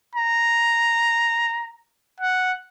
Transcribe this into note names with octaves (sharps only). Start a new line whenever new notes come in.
A#5
F#5